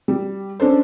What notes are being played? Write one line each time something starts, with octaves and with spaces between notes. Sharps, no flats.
G3
C#4 D4 A4 C5